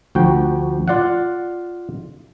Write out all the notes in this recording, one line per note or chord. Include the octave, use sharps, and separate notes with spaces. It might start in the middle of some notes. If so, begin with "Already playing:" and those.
D2 F3 F#4 G5
F4 D5 F5 F#5